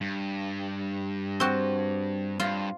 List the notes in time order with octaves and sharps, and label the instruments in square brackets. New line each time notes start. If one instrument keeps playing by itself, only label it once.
[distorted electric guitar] G2
[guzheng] C4 F#4
[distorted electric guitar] G2 [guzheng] F4